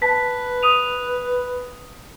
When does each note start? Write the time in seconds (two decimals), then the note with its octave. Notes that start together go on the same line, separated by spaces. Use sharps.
0.02 B4 A5 B6
0.63 D#6 D#7 F7